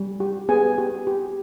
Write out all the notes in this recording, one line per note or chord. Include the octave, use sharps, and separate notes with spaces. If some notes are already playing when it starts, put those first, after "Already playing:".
Already playing: G3
G4
B3 G#4 G#5
G4
G4